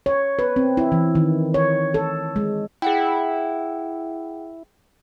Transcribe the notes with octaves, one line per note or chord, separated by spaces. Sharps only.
C#5
B4
C4
E4
E3
D#3
C#5
A4
G#3
E4 G#4 F#5 G5